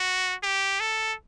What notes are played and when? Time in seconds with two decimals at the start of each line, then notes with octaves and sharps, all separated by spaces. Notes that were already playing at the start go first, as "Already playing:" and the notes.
Already playing: F#4
0.43 G4
0.80 A4